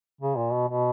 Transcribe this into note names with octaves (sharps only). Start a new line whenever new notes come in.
C#3
A#2
B2
B2